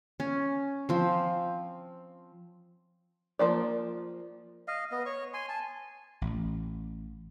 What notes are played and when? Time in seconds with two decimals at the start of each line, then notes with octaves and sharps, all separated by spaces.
0.20 C#4
0.89 F3 C4
3.39 F3 A#3 D5
4.68 D#5 F5
4.92 B3 D#5
5.06 C#5 C#6
5.34 G#5 C6
5.49 G#5 A5
6.21 A1